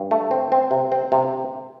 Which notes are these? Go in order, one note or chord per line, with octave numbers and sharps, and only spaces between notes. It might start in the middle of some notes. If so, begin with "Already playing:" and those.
Already playing: G2
A3
C4
C4
C3
C4
C3